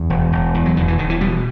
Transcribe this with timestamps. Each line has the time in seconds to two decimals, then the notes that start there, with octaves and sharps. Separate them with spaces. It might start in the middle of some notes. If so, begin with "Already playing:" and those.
Already playing: E2
0.10 E1
0.32 E1
0.55 E2
0.66 F#3
0.76 E1 D#3
0.88 E3
0.99 E1 D#3
1.10 E3
1.21 B2 G3